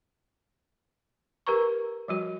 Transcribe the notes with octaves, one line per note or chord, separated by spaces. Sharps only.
G4 A#4 B4 A#5 C#6
F3 G3 F#4